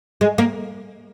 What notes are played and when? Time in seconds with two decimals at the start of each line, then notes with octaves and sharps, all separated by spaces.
0.21 G#3
0.38 A#3